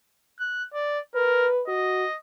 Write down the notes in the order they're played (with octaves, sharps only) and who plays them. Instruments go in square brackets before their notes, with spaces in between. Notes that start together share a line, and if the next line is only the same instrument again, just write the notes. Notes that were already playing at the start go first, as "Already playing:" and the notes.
[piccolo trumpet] F#6
D5
[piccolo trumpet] A#4 [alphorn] B4
[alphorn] F#4 [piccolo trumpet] D#5